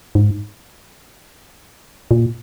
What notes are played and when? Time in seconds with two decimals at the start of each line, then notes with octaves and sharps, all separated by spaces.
0.15 G#2
2.11 A#2